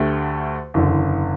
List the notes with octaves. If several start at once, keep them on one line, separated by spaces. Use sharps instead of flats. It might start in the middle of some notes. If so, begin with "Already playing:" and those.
Already playing: D2 D3 A3 G4
F#1 E2 D3